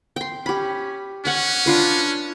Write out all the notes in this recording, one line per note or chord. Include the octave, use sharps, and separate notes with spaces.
G5 C6
C#4 G4 B5
C#4 D5 F#5 C#6
D4 F4 B4